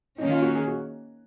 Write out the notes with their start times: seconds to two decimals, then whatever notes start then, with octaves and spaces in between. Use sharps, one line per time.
0.18 D#3 A#3 C#4 D#4
0.31 F4
0.42 F#4
0.55 G#4
0.67 F#4